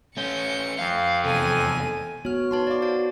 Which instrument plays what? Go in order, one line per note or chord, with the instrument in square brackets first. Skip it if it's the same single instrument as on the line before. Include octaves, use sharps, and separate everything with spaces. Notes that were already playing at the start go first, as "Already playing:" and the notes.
[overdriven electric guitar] A3 C#4 [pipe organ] G6 [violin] C#7
[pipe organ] F2 [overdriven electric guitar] F5
[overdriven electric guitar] E2 C3 [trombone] A4 [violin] G#5 D#7
[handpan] B3 F#4 [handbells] C#5 F6
[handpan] D#4 F#4 B4 [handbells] C#5 A5 C6
[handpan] C#5 F5 [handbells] D5 D6
[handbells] F#4 C5 A5